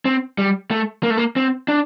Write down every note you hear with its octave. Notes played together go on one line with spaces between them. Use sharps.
C4
G3
A3
A#3
A3
A#3
C4
D4